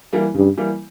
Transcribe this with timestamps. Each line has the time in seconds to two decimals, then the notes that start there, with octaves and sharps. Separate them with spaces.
0.13 E3 G3 A#3
0.34 G2 C#3
0.57 E3 G3 A#3